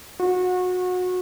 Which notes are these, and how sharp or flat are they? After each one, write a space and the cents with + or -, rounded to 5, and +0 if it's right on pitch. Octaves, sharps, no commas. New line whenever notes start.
F#4 -30